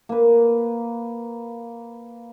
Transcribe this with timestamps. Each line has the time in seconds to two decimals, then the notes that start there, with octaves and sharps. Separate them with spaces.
0.09 A#3 B4